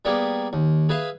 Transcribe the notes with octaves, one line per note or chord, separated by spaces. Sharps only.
G3 A#3 B3 G4 G#4
D#2
G#4 B4 E5 F5